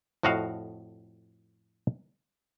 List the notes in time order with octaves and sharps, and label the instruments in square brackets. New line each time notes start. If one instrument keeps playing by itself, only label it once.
[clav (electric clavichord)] F2 A2 F#4 D#5 F5